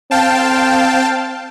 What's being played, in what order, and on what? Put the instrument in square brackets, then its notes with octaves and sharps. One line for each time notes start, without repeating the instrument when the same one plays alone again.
[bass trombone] C4 [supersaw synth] F5 G5 A5